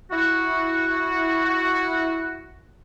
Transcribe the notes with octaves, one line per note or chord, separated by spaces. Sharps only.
E4 F#4